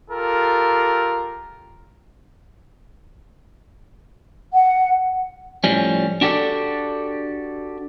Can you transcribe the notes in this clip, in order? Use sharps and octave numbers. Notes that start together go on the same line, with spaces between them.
F4 G4 A4 A#4
F#5
A2 F3 G3 C#4
D4 F#4 G4 A4 D5